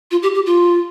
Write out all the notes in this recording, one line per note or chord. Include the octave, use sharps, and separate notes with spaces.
F4
G4
G4
F4